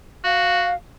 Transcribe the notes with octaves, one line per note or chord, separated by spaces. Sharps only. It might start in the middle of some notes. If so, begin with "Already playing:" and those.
F#4 F5